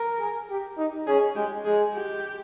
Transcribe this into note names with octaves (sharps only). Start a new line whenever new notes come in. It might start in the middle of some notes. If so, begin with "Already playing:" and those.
Already playing: A#4
G#4
G4
D#4
C#4 G#4
G#3 G4
G#3 G#4
G4